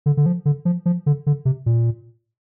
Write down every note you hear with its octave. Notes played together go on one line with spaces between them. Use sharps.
D3
D3
F3
D3
F3
F3
D3
D3
C3
A#2